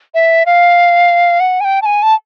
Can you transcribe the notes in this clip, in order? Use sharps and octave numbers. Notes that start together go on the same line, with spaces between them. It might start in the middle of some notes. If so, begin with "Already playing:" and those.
E5
F5
F#5
G#5
G5
A5
G#5
A5